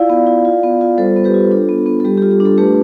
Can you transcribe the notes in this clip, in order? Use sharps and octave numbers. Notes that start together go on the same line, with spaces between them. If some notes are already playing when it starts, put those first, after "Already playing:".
Already playing: E4 F4 D5 F5
B3
E4
F4
B3
F4
G3 A4 C5
B3
G4 B4
F4
D4 A4
B3
B3
A4
G3 G4
G4
F4
G4
D4
A4
A3 G4 B4